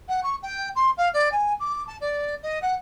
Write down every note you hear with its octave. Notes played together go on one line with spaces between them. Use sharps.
F#5
C#6
G5
C6
F5
D5
G#5
D6
A5
D5
D#5
F#5